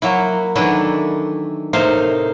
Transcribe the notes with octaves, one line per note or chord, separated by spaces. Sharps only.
F#3 A#3 E4
D#3 E3 F#3 A3 D4 E4
A2 C3 A#3 D#4 C5 F5